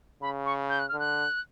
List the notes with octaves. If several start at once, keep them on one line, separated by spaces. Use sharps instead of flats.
C#3 B5
C#6
G6
F#6
D3 F6
F#6